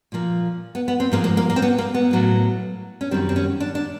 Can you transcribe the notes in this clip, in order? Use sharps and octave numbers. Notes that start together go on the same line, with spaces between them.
A#2 F3 A#3
B3
B3
C4
G#2 F3 G#3 A#3
A#3
A#3
A#3
C4
B3
A#3
B3
A2 F#3 A#3
C#4
F#2 D#3 G3 C4
C4
C#4
D4
D4